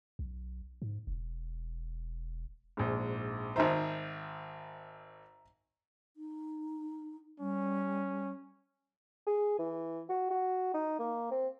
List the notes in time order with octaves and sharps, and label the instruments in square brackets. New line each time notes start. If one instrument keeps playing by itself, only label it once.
[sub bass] B1
G#2
E1
[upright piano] A#1 G#2
[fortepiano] G#1 D#3 C5 [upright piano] E5 A#5
[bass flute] D#4
[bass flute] G3 [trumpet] C#4
[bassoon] G#4
E3
F#4
F#4
D#4
A#3
C4